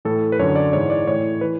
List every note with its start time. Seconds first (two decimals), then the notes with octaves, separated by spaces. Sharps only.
0.05 A2 E3 A4
0.32 B4
0.39 F#2 D3 C#5
0.56 D5
0.73 G#2 E3 C#5
0.90 D5
1.07 A2 E3 C#5
1.41 E3 B4